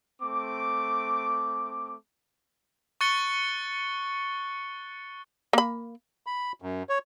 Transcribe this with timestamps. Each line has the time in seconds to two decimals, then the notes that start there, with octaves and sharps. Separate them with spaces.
0.22 A3 C4 D6
3.01 C#6 F#6 A6 C#7 G7
5.53 A#3 B5
6.26 B5
6.62 F#2
6.89 C#5